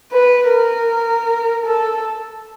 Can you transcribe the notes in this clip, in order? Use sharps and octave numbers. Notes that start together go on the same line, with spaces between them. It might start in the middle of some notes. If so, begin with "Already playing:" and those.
B4
A#4
A4